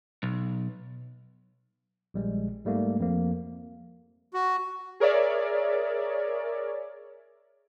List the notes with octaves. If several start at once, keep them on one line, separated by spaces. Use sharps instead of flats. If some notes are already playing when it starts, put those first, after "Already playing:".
B1
A#1 G3 G#3
G#2 G3 A3 A#3
F2 F3 A#3
F#4
G#4 A#4 C#5 D5 E5